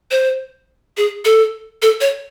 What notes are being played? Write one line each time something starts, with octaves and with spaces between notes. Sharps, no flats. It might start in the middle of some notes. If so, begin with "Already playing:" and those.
C5
G#4
A4
A4
C#5